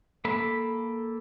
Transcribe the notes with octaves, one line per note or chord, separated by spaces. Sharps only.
A#3 A4 B5